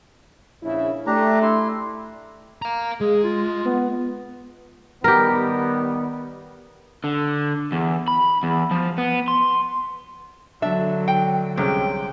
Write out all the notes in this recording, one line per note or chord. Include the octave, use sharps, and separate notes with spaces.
A#1 C#3 E4
A3 D4 G4 A#5
E4 C6
F5 A#5
G#3 G#4
F4
B3
D#3 G3 B3 G4 A#4
D3
E2
B5
E2
F3
B3
C6
D3 F#3 D4 E5
G5
C2 C3 G#3 C#4 G5